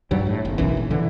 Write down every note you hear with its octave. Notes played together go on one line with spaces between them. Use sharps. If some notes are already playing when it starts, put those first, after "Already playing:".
G2 F#3 G3
A2
G1
F#1 B1 F#2 E3
A#1
F2 D3 E3